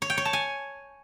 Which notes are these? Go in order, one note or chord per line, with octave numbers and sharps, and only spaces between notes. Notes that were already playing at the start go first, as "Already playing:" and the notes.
C#5
G5
C#5
A5
G#5